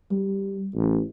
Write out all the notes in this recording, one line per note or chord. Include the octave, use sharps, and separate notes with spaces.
G3
A1